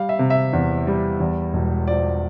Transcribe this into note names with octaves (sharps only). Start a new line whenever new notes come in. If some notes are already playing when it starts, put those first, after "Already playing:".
Already playing: G3 F5
E5
C3
E5
E2
G3
E2
E1
F3 D5